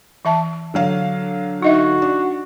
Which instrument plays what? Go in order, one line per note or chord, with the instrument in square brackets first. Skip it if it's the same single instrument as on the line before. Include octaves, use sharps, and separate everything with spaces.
[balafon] E3 E5 A5
[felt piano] D3 F#3 F5
[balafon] D#4 D#5 E5 [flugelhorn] F#4
[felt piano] D4